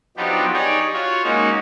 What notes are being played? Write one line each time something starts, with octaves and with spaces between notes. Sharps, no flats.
F3 F#3 B3 D4 D#4 G4
D#4 G4 G#4 C#5 D5
F4 F#4 C#5
G#3 A#3 C#4 D#4 F#4